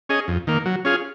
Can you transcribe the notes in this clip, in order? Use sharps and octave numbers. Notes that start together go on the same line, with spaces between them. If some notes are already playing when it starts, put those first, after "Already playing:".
C#4 G#4 D#5
F2
D#3 A#3
F#3
C#4 F4 G#4